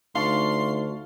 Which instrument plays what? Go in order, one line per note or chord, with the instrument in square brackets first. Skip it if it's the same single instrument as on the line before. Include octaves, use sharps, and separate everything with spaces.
[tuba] D2 [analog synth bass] D#4 [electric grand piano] F5 A5 C#6 [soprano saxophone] C6